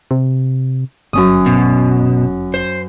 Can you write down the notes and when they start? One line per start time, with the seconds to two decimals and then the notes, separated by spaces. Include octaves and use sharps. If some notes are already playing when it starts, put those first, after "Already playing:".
0.11 C3
1.13 G1 F#2 C#4 D#6
1.46 B2
2.54 C5